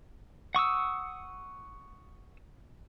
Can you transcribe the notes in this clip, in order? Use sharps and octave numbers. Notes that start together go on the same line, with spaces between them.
F#5 C#6 D#6 E6